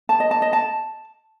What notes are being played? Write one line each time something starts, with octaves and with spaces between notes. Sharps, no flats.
A5
D#5
A5
D#5
A5